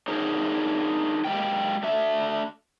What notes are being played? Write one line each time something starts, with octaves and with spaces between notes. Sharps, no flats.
D4 D#4 G#4 A#4 C5 C#5
G#3 A#3 G4 G5
A3 D4 E5